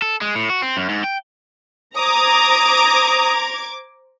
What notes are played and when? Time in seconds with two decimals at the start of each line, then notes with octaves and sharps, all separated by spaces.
0.02 A4
0.21 G#3
0.35 A2
0.50 F#4
0.62 C4
0.77 F#2
0.89 G#2
1.04 G5
1.96 C5 A#5 D6 D#6 G#6